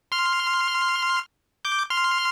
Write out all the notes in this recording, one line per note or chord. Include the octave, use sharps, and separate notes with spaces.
C6 F6
D6 G6
C6 F6